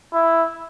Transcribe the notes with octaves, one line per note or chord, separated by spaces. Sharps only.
E4